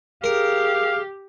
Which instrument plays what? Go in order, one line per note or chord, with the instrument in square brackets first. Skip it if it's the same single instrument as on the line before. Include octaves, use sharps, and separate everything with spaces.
[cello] G4 [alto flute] G#4 [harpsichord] A#4 [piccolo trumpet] F5